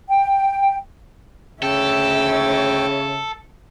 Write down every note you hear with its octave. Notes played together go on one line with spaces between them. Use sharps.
G5
D2 C#3 A4 C#5 E5 G5 E6